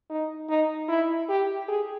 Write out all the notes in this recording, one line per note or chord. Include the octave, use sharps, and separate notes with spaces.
D#4
D#4
E4
G4
G#4